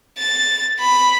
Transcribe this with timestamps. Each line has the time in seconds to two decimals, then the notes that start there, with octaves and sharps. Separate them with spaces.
0.18 A6
0.79 B5